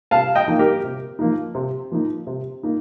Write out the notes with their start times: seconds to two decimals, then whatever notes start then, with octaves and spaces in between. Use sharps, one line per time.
0.11 C3 F5 A5
0.35 D#5 G5
0.48 F3 A#3 D#4
0.59 G4 A#4
0.84 C3
1.19 F3 A#3 D#4
1.55 C3
1.92 F3 A#3 D#4
2.27 C3
2.63 A#3 D#4